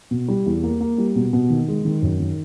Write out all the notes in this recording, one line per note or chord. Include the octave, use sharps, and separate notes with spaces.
B2
G3
E2
A#3
A#3
G3
B2
B2
D#3
G#3
D#3
F#2
D#3